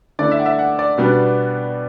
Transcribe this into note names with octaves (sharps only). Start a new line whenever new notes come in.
D3 A3 E4 D5
E5
F#5
E5
F#5
D5
B2 G3 B3 D4